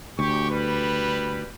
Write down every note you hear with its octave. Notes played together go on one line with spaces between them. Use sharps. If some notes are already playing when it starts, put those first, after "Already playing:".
D2 G4 C#6
G3 B4